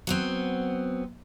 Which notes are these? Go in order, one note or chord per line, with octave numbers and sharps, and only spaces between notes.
F#3 B3 C4